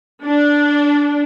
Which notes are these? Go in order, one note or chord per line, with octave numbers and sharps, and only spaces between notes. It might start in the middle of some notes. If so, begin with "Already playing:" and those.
D4